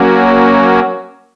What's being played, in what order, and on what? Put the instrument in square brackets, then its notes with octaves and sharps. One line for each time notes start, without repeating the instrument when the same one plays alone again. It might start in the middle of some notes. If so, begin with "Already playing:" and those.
Already playing: [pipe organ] F#3 A#3 C#4 F#4